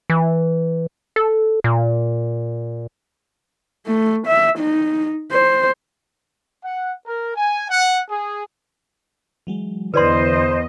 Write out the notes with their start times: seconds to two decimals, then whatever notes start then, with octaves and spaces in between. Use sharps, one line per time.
0.10 E3
1.16 A4
1.64 A#2
3.87 A3
4.27 E5
4.59 D#4
5.32 C5
6.64 F#5
7.06 A#4
7.35 G#5
7.70 F#5
8.09 G#4
9.47 E3 F#3 G#3
9.94 E2 D3 E4 B4 C5 D5 D#5 C6